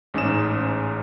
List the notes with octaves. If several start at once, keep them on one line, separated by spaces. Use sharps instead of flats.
A1 G#2 C#4 D#4 D#6 E7